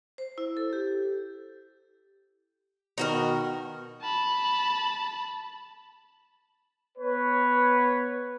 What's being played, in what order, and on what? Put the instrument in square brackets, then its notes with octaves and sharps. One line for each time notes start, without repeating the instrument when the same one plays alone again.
[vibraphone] C5
E4
A4
G4
[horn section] B2 D#3 [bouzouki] D#4 F#4 A#4
[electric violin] A5 B5
[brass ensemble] B3 B4 C#5